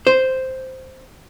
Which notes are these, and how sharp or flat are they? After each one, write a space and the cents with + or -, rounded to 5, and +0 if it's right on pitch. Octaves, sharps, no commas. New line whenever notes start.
C5 -5